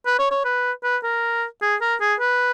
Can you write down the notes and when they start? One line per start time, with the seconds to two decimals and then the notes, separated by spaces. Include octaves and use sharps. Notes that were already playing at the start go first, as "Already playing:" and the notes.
0.06 B4
0.19 C#5
0.31 C#5
0.44 B4
0.83 B4
1.04 A#4
1.62 G#4
1.81 A#4
2.01 G#4
2.20 B4